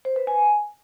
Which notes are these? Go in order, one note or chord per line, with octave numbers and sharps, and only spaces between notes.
C5
B4
G#5